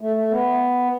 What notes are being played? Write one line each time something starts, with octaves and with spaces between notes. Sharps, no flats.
A3
A3
B3